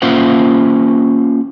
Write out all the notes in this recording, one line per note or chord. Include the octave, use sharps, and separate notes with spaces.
A#3 C#4 F4 C5 E5 F#5